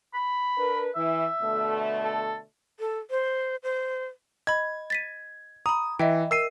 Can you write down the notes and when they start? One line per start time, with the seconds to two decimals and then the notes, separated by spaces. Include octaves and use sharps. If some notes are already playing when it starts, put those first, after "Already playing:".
0.14 B5
0.58 D4 A#4 B4
0.95 E3 E5
1.41 B2 D3 A3
2.04 A4
2.80 A4
3.11 C5
3.63 C5
4.47 D#5 B5 G#6
4.90 A6 B6 D#7
5.66 A#5 B5 D#6
5.99 E3 D#5 E5 G5
6.31 A#4 E6 C7 D#7